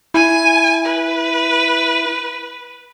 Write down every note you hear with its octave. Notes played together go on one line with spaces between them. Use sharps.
E4 G#5
B4